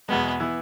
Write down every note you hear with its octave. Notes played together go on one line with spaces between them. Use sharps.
E2 B2 G#3 B3
E3 B3 E4